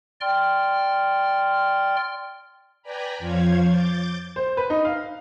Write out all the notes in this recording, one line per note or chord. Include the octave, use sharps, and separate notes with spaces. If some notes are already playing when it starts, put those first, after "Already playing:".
D5 G5 C6 F6
B4 D5 G5 G#5 A#5 B5
F2 F3 C5 C#5 F5 G#6
D6 G6 A6
C5
B4
D#4
F5